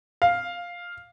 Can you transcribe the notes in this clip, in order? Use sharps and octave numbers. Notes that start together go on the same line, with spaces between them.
F5